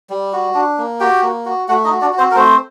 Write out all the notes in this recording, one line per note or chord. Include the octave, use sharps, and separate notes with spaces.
G3
F#4
D4
A#3
F#4 G4 G5
A#3
F#4
A3 F#4 F#5
D#4 D#5
F#4
D4 D5
F#4
C4 C5
A#4
A3 C4 C5